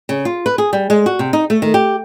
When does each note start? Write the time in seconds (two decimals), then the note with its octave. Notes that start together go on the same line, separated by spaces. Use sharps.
0.09 C#3
0.25 F4
0.46 B4
0.58 G#4
0.73 G3
0.90 G#3
1.06 F#4
1.19 C3
1.33 D#4
1.50 A3
1.62 D#3
1.74 G4